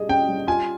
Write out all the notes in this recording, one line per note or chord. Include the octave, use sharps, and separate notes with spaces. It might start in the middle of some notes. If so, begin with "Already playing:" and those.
Already playing: G3 G#4 D#5
C#4 G5
G3
F4 G#5